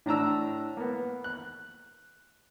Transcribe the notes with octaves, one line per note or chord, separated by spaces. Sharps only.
A2 D4 A#5 E6
A#3 B3
F#6